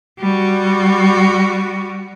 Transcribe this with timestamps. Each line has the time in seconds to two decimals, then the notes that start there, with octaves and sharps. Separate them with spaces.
0.20 G3 F#4